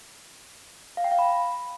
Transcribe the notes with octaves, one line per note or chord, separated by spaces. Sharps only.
F5
G5
F5
B5